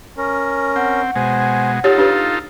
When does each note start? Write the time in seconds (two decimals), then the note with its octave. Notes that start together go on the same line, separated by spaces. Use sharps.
0.18 C#4 A#4
0.76 C4 F#5
1.16 B2 G#3 C5 G#5
1.84 D#4 F4 G4 A4 C#5
1.98 D4 G4 B4 F5